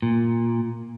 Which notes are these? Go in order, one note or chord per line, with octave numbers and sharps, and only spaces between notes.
A#2